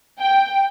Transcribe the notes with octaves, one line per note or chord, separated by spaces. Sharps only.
G5